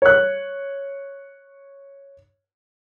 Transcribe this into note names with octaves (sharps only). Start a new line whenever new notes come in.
C#5 F#6